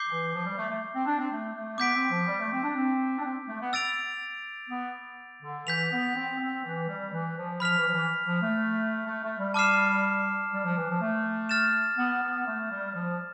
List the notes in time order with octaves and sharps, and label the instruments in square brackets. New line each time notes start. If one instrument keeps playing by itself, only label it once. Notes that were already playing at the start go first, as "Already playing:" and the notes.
Already playing: [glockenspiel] D6 G6 C7 G7
[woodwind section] E3
F3
G3
A3
A3
C4
D4
C4
A3
A3
[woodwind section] B3 [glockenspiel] D6 G6 B6 D7
[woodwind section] C4
F3
G3
A3
C4
D4
C4
D4
C4
A3
B3
[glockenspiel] E6 A6 D7 F7
[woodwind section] B3
D3
[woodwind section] E3 [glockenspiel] G6 B6 F7
[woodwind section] B3
C4
C4
E3
G3
E3
F3
[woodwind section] F3 [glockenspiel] B5 F6 B6 F7
[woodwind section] E3
F3
E3
F3
A3
A3
A3
G3
[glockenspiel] A5 D6 F6 C7 E7
[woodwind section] G3
F3
E3
F3
A3
[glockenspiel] F6 A6 E7
[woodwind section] B3
B3
A3
G3
F3